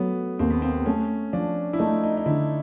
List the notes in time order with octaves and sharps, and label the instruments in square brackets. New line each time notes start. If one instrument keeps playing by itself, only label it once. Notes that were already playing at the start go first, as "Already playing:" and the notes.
Already playing: [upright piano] F#3 [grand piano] A3 B3
[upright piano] D#2 [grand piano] C4
[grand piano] B3
C4
[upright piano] A3 [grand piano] C#4
[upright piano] F3 [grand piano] D4
[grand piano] E4
[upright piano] A3 [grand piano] D#4
[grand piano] D#4
D#4
[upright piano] D3 [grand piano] E4